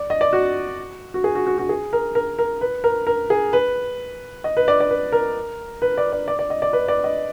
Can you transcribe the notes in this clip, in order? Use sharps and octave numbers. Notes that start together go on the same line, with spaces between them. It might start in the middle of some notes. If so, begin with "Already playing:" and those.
Already playing: D5
D#5
D5
F#4
F#4
G#4
F#4
F#4
F#4
G#4
A#4
A#4
A#4
B4
A#4
A#4
G#4
B4
D#5
B4
D5
D5
B4
A#4
B4
D5
D5
D5
D5
D#5
D5
B4
D5
D#5